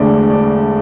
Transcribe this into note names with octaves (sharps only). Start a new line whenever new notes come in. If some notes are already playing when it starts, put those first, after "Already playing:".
Already playing: E1 D2 D3 D5
D5